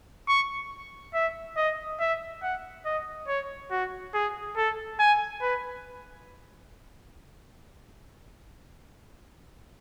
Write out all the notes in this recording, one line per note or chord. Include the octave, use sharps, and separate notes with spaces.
C#6
E5
D#5
E5
F#5
D#5
C#5
F#4
G#4
A4
G#5
B4